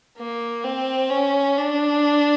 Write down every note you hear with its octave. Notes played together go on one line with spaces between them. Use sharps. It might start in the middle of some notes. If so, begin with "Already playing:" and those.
A#3
C4
C#4
D4